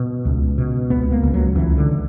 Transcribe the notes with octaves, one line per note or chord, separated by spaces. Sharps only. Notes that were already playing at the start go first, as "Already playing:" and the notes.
Already playing: B2
C#2
B2
C#2 B3
A#3
C#2
F#3
C#2 E3
D3